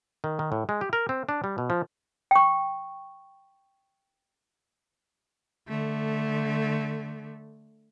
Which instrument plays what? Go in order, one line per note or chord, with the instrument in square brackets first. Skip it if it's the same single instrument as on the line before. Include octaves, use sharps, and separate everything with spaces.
[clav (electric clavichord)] D#3
D#3
A2
G#3
G4
A#4
C4
D4
G3
B2
F3
[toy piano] G5 C#6
[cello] D3 A3